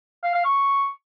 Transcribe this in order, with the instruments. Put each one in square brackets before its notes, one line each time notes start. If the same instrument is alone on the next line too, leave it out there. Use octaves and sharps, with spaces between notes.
[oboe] F5
F5
C#6